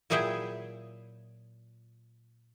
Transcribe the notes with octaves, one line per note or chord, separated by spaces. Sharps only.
A#2 F#3 E4 G#4 E5 G5